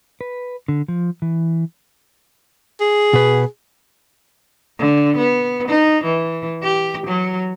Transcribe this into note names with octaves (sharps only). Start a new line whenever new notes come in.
B4
D3
F3
E3
G#4
B2 B4
D3
B3
D#4
E3
G4
F#3